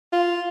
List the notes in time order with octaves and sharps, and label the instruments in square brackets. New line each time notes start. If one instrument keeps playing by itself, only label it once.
[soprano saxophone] F4